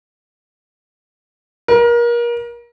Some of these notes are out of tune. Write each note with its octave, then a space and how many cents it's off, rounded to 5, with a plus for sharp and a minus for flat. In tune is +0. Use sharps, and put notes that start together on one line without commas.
A#4 +30